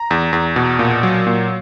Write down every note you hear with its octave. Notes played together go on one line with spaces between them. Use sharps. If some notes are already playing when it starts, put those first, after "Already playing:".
Already playing: A#5
E2
E2
B2
A#2
F#3
A#2